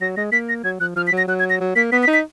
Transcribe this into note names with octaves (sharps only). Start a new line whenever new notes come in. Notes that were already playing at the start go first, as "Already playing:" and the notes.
F#3 A#6
G#3 A#6
A#3 B6
A#6
F#3 G#6
F3 F#6
F3 F6
B6
F#3
A#6
F#3 F#6
G#6
A#6
F#3
A#3 B6
B3 B6
B6
D#4
B6